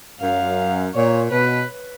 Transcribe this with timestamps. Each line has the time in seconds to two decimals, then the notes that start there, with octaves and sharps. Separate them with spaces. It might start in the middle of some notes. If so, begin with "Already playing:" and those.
0.21 F#2 F5
0.95 A#2 C#5
1.31 B2 B4